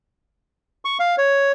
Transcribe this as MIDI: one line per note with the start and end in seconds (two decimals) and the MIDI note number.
0.85 0.98 85
1.00 1.16 77
1.18 1.52 73